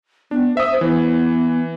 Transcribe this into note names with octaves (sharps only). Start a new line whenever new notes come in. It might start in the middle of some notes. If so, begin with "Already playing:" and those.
B3 D4
C5 E5 D#6
E3 B3